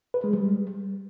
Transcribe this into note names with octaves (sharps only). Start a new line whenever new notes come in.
B4
G#3
G3